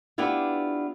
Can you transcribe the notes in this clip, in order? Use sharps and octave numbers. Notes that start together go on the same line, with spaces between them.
B3 D4 E4 F4 G4